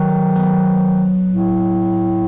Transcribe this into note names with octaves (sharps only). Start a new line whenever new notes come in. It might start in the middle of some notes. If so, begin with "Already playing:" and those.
Already playing: D#3 F#3
B3
A2